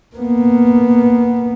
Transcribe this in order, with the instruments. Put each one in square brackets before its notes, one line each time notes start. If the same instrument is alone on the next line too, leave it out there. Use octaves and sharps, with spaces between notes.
[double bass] A#3 B3